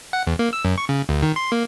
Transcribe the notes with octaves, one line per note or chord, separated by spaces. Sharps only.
F#5
E2
A#3
E6
F#2
C#6
C#3
D2
D#3
C6
A#3